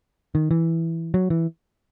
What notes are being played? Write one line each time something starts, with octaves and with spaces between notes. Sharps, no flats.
D#3
E3
F#3
E3